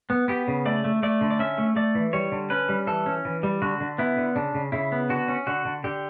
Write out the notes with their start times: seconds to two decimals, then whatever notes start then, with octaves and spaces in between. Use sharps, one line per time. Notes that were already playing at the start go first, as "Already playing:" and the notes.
0.10 B3
0.28 B3 G4
0.48 C#3
0.65 A3 D5
0.84 A3
1.03 A3 D5
1.21 D3
1.30 D5
1.39 C#4 E5
1.58 A3
1.76 A3 D5
1.95 E3
2.13 G3 C#5
2.32 D3
2.50 C#4 B4
2.69 G3
2.87 E3 A4
3.06 C#4
3.25 E3
3.43 G3
3.62 D3 F#4
3.80 D3
3.98 B3 E4
4.17 D3
4.36 C#3 D4
4.55 C#3
4.72 C#3 E4
4.92 B3
5.09 D3 F#4
5.28 C#4
5.47 D3 F#4
5.65 D3
5.84 D3 G4